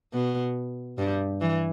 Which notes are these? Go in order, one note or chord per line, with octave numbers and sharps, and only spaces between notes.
B2 B3
G2 G3
E3